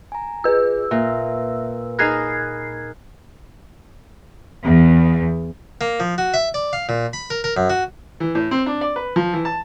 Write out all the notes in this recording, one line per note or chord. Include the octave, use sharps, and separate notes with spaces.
G#5 A#5
F4 G#4 B4 E6
A#2 E5
D#4 G#4 A#4 B5 D#6 F#6 G#6 C7
E2
A#3
F3
F#4
E5
D5
F5
A#2
B5
A#4
A#4
F#2
F#4
E3
A2
C4
D4
D5
B4
F3
E3
A5